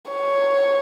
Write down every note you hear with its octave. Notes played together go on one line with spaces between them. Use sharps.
C#5